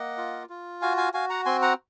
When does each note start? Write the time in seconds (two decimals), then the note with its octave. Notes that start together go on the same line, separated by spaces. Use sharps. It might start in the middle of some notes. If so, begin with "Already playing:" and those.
Already playing: A#3 D#5 F#5
0.17 F4
0.50 F4
0.82 F#4 F5 G#5
0.97 F5 G#5
1.14 F#4 F5 G#5
1.30 F#5 A#5
1.46 C4 G#5 C6
1.62 F#5 A#5